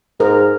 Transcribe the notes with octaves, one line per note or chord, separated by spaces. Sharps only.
G#2 A#4